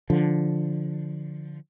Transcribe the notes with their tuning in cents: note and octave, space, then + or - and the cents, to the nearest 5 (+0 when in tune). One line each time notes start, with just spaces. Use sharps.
D3 +0 F3 +0